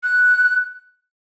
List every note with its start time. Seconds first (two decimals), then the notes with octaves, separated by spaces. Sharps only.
0.03 F#6